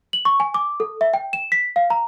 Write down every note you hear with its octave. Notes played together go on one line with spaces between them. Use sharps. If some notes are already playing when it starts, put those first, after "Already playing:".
F#7
C#6
G#5
D6
A4
E5
G5
E7
B6
F5
A#5